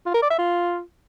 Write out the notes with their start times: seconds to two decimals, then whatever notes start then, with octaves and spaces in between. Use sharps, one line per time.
0.06 F4
0.14 A#4
0.22 D5
0.30 E5
0.38 F4